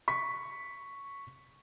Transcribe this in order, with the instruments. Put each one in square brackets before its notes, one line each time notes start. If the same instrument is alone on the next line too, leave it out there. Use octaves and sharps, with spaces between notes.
[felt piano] C#6 B6